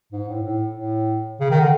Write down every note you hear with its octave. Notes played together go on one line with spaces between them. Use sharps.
G#2
A2
A2
A2
C#3
D#3
D3